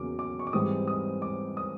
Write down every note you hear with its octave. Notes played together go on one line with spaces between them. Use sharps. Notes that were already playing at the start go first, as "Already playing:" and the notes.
Already playing: E2 C#3 F#3 A#3 D6
D6
C#6
D6
G#2 E3 G3 C4 D#6
D#6
D6
D#6